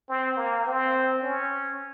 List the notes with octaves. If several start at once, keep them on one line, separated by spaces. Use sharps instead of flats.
C4
A#3
C4
C#4